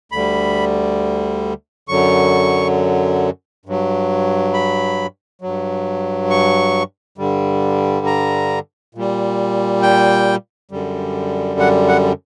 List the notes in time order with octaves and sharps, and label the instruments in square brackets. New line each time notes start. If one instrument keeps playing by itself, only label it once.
[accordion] D2 D3 G3 B5
F#2 D3 F#3 C#6
G2 F#3
B5
G2 F#3
C#6
G2 D3 G3
A#5
A#2 G3
G5
F#2 D3 G3
F#5
F#5